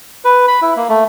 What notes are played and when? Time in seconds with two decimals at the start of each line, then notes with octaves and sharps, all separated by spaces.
0.25 B4
0.48 B5
0.62 E4
0.76 A#3
0.89 A3